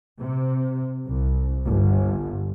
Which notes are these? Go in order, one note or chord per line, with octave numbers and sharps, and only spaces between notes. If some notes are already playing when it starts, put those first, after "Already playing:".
C3
C2
G1